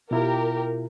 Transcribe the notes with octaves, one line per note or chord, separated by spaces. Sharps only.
B2 E4 F4 G4 A#4